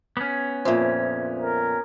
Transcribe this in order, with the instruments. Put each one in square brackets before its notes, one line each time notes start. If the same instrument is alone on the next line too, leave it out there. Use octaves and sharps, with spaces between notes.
[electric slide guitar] B3 C#4
[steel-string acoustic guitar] F2 A#2 [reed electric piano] C5 E5
[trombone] A#4